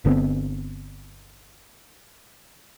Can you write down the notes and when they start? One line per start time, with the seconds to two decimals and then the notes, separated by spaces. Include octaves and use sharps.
0.05 G1 D3 B3 C4